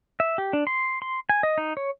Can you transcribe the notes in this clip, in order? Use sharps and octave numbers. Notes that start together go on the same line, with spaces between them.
E5
G4
D4
C6
C6
G#5
D#5
D#4
C#5